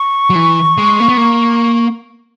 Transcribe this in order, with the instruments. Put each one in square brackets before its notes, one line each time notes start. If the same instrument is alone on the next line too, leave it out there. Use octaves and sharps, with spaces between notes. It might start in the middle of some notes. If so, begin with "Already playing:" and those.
Already playing: [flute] C#6
[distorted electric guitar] F#3
E3
G#3
A#3
B3
A#3